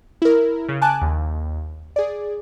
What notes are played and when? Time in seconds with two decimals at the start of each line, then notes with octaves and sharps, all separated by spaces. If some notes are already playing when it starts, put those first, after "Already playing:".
0.22 E4 A#4
0.69 C#3
0.82 G#5 A5 D6 F#6
1.02 D#2
1.96 G#4 D5